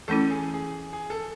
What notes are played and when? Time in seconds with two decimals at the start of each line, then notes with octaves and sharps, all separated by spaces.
0.08 E3 A3 C#4 E4 A4
0.30 G#4
0.54 G#4
0.93 G#4
1.10 A4